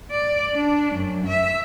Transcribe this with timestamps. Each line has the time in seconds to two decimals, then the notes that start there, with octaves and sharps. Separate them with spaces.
0.11 D5
0.55 D4
0.96 F#2
1.26 E5